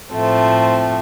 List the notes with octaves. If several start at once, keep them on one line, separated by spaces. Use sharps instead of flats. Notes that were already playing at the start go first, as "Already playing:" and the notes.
A2 F3 A3 C4